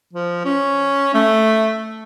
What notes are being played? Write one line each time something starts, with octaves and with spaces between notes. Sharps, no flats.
F3
C#4
A3